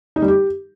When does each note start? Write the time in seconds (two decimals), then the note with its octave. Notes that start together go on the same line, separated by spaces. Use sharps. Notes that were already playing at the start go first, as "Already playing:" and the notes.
0.16 D#4
0.22 G3
0.28 G4